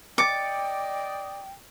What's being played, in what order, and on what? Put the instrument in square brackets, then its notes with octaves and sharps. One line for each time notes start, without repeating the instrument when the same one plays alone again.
[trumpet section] D5 D#5 [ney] G5 [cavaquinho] D6 [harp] A6 C#7